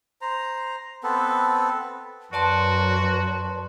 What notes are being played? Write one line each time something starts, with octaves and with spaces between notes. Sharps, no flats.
C5 A#5
B3 C4 A4 B4
F#2 F#4 B4 D5 A5 C6